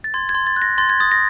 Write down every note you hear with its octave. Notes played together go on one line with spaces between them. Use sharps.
A6
C6 G#6
G#6
C6
A6
F#6
A#6
C6 A6
G#6
D#6 A6
A#6